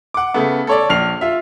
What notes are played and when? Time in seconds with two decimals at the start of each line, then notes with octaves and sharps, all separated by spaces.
0.14 F#5 D6
0.34 C#3 A3 B3
0.67 A4 C#5 D5
0.90 A#1 F6 C7 F7
1.21 F4 E5